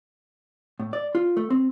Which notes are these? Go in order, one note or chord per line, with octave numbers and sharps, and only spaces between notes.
A2
D5
F4
A3
C4